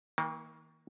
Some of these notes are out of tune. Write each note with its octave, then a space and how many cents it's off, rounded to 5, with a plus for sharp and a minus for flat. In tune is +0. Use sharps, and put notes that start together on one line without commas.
D#3 +40 A#3 +0